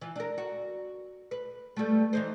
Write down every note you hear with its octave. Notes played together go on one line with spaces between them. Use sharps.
E3 F4
D4 A#4
F#4
B4
G3 A3
E3 D#4 C5